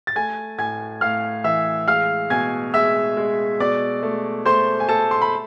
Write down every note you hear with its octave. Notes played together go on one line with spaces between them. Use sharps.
A6
A3 G#5 G#6
A2 G#5 G#6
A2 F5 F6
E3 E5 E6
G#3 F5 F6
B2 G#5 G#6
G#3 E5 E6
G#3
B2 D5 D6
A3
A3 C5 C6
G#5
A3 A4 A5
C6
B5